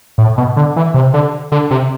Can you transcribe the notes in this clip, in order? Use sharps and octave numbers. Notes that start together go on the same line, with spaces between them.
A2
B2
D3
E3
C3
D3
D3
C3